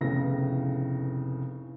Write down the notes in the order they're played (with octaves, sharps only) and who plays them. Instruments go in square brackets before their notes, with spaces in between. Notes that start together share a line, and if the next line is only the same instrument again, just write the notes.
[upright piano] F1 A2 C#3 B3 C#4 A#6